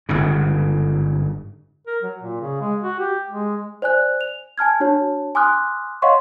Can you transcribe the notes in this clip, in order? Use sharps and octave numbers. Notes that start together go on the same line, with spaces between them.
G1 G#2 C#3
A#4
F#3
A#2
C#3
G#3
F#4
G4
G#3
C5 D5 G#5 F#6
F7
G#5 A5 F6 G#6
D4 F#4 C#5 A5
G#5 C6 D6 D#6 F6 F#6
C#5 D#5 F5 F#5 C6 C#6